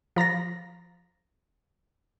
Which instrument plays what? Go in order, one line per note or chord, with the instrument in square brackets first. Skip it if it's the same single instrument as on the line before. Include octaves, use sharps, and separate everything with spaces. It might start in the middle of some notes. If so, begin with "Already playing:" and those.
[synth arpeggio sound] F3 A#5 A6 A#6